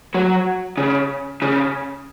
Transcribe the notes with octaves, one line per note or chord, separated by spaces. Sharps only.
F#3
C#3
C#3